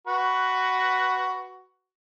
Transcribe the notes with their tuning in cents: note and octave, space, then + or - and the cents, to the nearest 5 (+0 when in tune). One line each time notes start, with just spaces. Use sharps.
F#4 +10 B4 +0